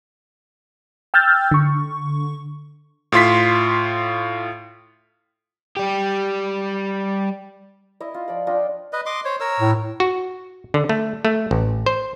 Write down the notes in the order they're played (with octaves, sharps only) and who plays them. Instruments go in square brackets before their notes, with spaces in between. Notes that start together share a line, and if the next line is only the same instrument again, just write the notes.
[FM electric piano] G5 E6 F6 G6 A6
D3 C#6
[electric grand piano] A2 F4 C6 B6
[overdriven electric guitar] G3 G4
[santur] E4 D#5
F4
F3 D5 B5
D4 F4 D#5 G5
[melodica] B4 D#5
D#5 C6 D6
C5 C#5
A#4 C#5 E6
[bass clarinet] A2
[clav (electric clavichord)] F#4
D3
A3
A3
A1
C5